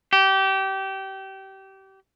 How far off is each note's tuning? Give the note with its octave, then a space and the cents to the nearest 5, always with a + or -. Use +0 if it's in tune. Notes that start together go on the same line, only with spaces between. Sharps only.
G4 -25